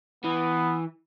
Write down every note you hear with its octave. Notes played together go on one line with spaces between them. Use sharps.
E3 B3